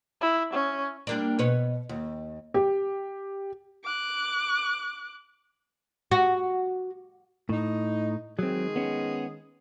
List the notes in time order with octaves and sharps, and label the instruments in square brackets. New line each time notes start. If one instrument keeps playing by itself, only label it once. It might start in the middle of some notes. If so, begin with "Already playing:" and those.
[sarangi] E4
C#4
[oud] G3 A#3 D4
B2 B4 C#5
D#2
[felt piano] G4
[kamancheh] D6 F#6
[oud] F#4
[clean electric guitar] A2 [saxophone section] D#4
[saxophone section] D#3 G#3 G#4 [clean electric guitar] F#3 C4
[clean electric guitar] B3 C#4